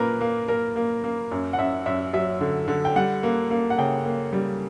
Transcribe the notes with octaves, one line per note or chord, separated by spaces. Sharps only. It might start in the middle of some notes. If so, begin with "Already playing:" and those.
Already playing: A#2 A#3 A#4 B4
A#3
A#3 A#4
A#3
A#3
F#2
F#5
F#2 E5
F#2 E5
F#3 E5
D3
D3
G5
G3 F#5
A#3
A#3
F#5
C#3 G5
A#3
G3